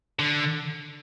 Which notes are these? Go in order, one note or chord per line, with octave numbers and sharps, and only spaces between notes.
D3